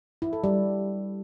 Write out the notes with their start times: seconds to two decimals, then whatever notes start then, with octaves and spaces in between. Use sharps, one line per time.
0.22 E4
0.33 A4
0.44 G3